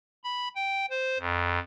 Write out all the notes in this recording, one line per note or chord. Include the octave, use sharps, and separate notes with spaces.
B5
G5
C5
F2